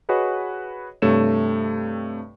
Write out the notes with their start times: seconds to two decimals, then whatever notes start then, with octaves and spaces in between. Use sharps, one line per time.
0.09 F#4 G#4 B4 C#5 D#5
1.02 G2 C3 A3 C#5 E7